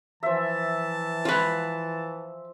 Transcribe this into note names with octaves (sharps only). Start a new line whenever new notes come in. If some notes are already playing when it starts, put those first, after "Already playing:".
E3 F3 E5 A5
F4 B4